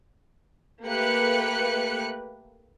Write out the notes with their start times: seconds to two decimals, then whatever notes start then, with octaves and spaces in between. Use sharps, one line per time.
0.85 A3 A#3 G4 B4 F#6 C#7